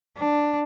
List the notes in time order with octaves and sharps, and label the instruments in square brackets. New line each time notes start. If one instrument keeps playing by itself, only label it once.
[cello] D4